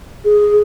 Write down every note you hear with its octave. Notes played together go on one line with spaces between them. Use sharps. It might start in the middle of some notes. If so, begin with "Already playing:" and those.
G#4